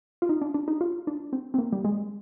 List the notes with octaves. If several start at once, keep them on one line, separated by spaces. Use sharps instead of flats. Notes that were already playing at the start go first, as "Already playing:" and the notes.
F4
D#4
D4
D4
D#4
F4
D4
C4
C4
A#3
G3
G#3